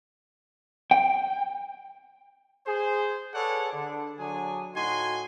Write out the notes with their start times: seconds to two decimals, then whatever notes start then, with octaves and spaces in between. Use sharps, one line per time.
0.91 G5
2.67 G#4 C5
3.34 G#4 A4 B4 C#5 D5 F#5
3.73 D3 D4
4.19 D3 F#3 D4 G#4 G#5
4.76 A2 D#4 F#4 G#5 C6